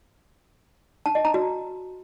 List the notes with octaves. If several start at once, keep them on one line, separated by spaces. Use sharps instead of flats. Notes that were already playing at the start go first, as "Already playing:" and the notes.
A5
D#5
A#5
F#4